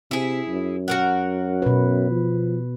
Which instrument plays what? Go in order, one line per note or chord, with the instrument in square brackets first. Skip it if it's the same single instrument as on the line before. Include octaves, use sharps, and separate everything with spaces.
[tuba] C3 [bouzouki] E4 G#4
[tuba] F#2
[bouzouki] F#4 A#4 F#5
[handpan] B2 B4
[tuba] F3